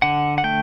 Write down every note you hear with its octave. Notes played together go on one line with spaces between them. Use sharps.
D3 F#5
F#5
A3 G5